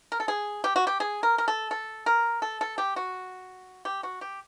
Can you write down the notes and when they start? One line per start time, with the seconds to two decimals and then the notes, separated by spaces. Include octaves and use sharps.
0.12 A#4
0.20 A4
0.28 G#4
0.64 G4
0.76 F#4
0.87 G4
1.00 G#4
1.23 A#4
1.38 A#4
1.48 A4
1.71 A4
2.06 A#4
2.42 A4
2.61 A4
2.78 G4
2.96 F#4
3.85 G4
4.03 F#4
4.21 G4